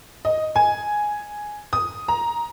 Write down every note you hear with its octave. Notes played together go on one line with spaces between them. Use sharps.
D#5
G#5
D#6
A#5